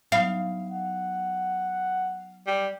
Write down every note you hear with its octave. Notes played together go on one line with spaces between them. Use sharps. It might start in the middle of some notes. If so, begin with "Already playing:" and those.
F#3 B3 D#4 F5
F#5
G3